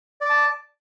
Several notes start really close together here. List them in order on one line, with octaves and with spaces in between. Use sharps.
D5 D6 A5